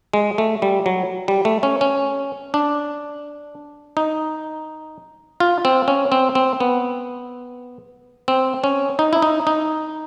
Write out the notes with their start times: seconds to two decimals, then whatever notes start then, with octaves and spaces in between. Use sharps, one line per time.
0.14 G#3
0.38 A3
0.62 G3
0.86 F#3
1.28 G3
1.45 A3
1.63 C#4
1.81 C#4
2.54 D4
3.97 D#4
5.40 F4
5.65 C4
5.88 C#4
6.12 C4
6.35 C4
6.60 B3
8.28 C4
8.64 C#4
8.99 D#4
9.13 E4
9.22 D#4
9.47 D#4